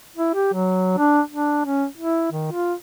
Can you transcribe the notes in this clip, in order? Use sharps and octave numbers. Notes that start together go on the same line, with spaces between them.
E4
G4
F#3
D4
D4
C#4
E4
D#3
F4